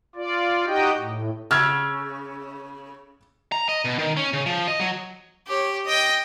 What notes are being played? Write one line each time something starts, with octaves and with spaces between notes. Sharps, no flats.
F4 D5
D#4 F#4 G4 D#5 G5
A2
C#3 E6 F6 G#6
A#5
D#5
B2
D#3
C#4
C#3
F3
D#5
F#3
G4 C#5
D#5 G5